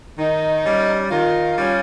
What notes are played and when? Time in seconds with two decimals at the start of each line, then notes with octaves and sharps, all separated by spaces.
0.19 D#3 D#4
0.65 G3 C#4
1.11 D#3 F4
1.58 G3 C#4